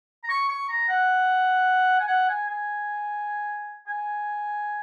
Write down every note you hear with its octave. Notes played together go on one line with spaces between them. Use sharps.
A#5
C#6
C#6
A#5
F#5
G#5
F#5
G#5
G#5
G#5